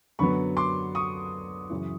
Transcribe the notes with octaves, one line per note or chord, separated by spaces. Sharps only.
F#2 D3 F#3 B3 B5 C#6
C6 D6
C#6 D#6
F#2 C#3 E3